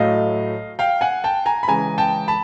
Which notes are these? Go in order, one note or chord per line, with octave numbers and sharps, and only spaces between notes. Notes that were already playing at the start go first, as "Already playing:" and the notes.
Already playing: A2 F#3 A3 D#5 F5
F5 G5
F#5 G#5
G5 A5
G#5 A#5
B5
C#3 E3 G#3 G#5 A#5
G5 A5
A5 B5